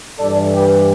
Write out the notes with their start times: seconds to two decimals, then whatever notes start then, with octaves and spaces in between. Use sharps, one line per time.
0.19 G2 E3 A4 D5
0.54 G4 B4